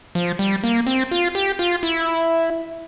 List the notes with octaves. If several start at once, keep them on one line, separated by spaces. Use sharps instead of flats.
F3
G3
A#3
C4
F4
G4
F4
E4